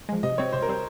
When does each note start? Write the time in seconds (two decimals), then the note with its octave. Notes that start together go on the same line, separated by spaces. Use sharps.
0.09 F3 G#3
0.23 C3 D#5
0.38 G3 C4 C#5
0.53 C3 C5
0.62 A#4
0.68 G3 C4